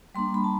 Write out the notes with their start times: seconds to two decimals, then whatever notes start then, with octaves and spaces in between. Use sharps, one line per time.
0.15 G3 A#3 D4 C6
0.34 B5
0.44 A5